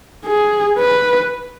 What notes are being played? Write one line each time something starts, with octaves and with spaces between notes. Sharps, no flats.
G#4
B4